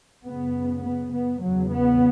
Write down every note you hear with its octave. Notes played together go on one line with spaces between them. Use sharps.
F#2 C#3 B3
B3
B3
E2 C#3 F#3
B3